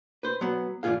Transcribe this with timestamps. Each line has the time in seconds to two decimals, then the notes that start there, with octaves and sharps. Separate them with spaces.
0.23 B4 C5
0.41 F#3 B3
0.83 E2 G#2 C3 F4 G#4 F5